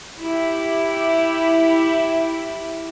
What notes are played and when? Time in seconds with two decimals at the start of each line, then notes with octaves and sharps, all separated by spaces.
0.18 E4 G4